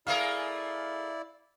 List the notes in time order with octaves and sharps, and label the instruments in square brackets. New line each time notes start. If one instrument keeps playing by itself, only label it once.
[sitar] A3 G#4 A#4 [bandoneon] E4 D5 [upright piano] F5